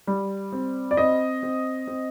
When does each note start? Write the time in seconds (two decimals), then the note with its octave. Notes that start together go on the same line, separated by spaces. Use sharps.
0.07 G3
0.53 C4
0.91 D5
0.97 C4 D#5
1.43 C4
1.87 C4